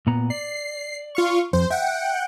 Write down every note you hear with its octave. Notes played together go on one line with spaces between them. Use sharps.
A#2 B3 A#5
D5 C7
F4 F5 C#6
F2 C5
E5 F#5 G5